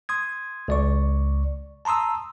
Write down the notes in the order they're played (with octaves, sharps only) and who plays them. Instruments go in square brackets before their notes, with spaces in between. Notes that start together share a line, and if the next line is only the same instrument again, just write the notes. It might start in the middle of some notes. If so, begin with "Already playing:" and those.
[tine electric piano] C6 D#6 G#6
C#2 D5 C#6
A5 A#5 C6 D#6 E6